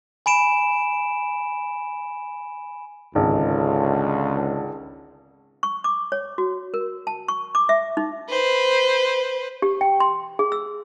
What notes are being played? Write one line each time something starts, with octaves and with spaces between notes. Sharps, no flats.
G#5 B5 D7 E7
G#1 C#2 D3
C#6
D6
C#5
F#4
A#4
A5
C#6
D6
E5
D#4
B4 C5
G4
G5
C6
G#4
E6